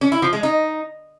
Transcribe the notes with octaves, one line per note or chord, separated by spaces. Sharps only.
C#4
E4
F3
G#3
D#4